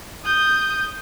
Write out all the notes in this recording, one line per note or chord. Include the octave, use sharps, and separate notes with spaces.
D#6 G6